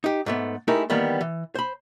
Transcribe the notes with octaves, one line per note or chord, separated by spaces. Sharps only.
D#4 G4
G#2 A3 B3
G#3 A3 D#4 E4 G4 A#4
D#3 E3 G3 A#3 B3
E3
C5 B5